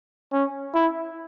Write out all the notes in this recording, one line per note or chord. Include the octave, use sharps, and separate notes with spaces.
C#4
E4